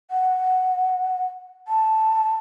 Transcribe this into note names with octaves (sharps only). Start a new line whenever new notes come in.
F#5
A5